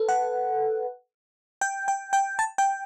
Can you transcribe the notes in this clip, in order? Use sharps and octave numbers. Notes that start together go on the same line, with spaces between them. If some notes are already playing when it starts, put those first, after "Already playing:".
Already playing: A4 B4
F#5
G5
G5
G5
A5
G5